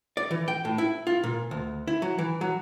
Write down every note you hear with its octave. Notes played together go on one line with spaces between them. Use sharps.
D5
E3
G5
A2
E4
F4
A#2
D2
E4
F#3
E3
F#3